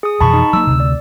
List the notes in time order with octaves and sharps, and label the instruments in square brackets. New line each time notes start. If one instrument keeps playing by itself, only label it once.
[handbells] G#4 D#6
[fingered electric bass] F2 B2 E3 [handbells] A5 B5 C#6
[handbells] D#4
[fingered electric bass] F#3 A#3 [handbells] E6
[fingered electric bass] D2 C3
[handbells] D5